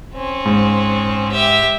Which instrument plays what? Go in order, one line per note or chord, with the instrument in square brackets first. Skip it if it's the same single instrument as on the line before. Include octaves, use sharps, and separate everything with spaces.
[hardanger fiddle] C4 C#4
[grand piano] G#2
[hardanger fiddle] G4 E5